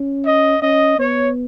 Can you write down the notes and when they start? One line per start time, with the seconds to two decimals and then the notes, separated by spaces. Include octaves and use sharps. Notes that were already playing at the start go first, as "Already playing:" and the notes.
Already playing: C#4
0.26 D#5
0.62 C#4 D#5
0.98 B3 C#5